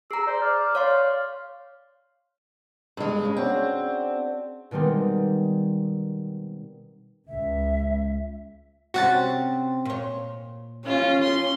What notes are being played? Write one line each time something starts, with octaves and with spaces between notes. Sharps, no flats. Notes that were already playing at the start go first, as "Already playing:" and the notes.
G#4 A#5 E6 C7
C5 D5
D5 F6
C#5 F5 C6
G2 G#3
C#3
C4 D4 F#4 C5
B2 D#3 G3 G#3 C4
C#2 E5
C3 C4 C#4 F#4 F#5 A6
A#2 C#5
C#4 F4
C6